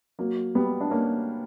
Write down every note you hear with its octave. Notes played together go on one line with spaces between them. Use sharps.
F#3 A#3
G3 B3
D4
A#3 C#4